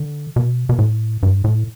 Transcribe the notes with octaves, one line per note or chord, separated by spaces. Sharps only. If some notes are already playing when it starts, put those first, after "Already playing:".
Already playing: D3
B2
B2
A2
G2
A2